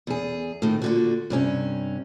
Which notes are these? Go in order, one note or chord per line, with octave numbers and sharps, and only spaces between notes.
E2 G#4
A2 D#3
A#2 D3 F#4
G2 C3 C#4